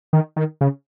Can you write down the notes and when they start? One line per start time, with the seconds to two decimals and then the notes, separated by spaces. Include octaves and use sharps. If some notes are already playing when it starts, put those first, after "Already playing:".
0.13 D#3
0.36 D#3
0.61 C#3